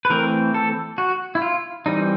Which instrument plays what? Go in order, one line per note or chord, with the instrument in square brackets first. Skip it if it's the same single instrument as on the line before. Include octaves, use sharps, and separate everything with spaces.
[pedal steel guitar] B4
E3 A3 C4 A#4
A4
F#4
E4
F4
E3 G3 C4 D#4